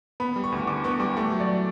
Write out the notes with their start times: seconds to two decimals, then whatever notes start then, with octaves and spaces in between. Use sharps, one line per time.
0.20 B3 B5
0.36 G3
0.44 C#6
0.52 D2
0.58 C#6
0.67 D3 D6
0.84 B3 C#6
1.00 G3 D6
1.16 A3 C#6
1.32 F#3
1.40 D5